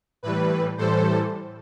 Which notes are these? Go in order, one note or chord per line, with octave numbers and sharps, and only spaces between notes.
A2 E3 G3 B4
A2 E3 G3 A4 C5